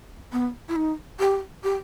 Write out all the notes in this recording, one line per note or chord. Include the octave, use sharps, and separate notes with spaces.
B3
E4
D#4
G4
G4